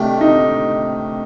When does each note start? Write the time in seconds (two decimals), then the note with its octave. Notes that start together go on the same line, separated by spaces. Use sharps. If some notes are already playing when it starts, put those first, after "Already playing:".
Already playing: C3 D#3 A3 D4 G4 A4
0.21 D#4